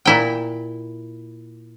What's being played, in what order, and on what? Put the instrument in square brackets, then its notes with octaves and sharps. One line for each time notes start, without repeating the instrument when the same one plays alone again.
[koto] A#2 E4 G5